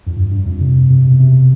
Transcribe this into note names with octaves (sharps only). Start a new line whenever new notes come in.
F2
G2
G2
F2
C3
C3
B2
C3